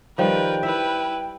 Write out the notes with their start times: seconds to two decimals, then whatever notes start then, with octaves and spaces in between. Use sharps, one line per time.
0.18 D#3 F3 G3 A#4 B4 G5
0.63 E4 B4 E5